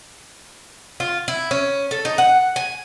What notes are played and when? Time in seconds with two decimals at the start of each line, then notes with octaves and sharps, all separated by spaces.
1.00 F4
1.28 E4
1.51 C#4
1.91 A4
2.05 D#4
2.18 F#5
2.56 G#5